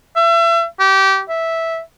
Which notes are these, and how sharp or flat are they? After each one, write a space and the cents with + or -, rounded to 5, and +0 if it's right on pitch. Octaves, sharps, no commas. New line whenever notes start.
E5 +35
G4 -25
E5 -5